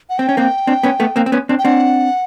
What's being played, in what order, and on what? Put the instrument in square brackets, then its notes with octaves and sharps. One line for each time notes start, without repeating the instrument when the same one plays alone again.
[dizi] F#5
[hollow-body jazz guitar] C4 [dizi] G5
[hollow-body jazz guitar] C#4
A#3 C4
C4 D4
B3 C#4
A3 B3
A#3 C4
C4
B3 C#4
C4 D4
[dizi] G5
[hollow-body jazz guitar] C4 D4 [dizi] F#5